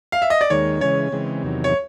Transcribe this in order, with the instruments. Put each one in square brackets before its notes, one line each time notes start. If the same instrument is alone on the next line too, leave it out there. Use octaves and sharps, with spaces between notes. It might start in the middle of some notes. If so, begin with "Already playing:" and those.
[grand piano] F5
E5
D#5
D5
[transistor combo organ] D#2 D#3 G#3 [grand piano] C#5
[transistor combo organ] C#3 E3 G#3 C#4 [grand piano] C#5
[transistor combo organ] C#3 E3 G#3 C4
E2 C3 D#3 F#3
[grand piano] C#5